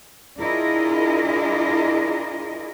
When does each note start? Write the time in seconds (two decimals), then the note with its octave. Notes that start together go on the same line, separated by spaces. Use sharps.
0.39 D4 E4 F4 G#4 A#4 D#5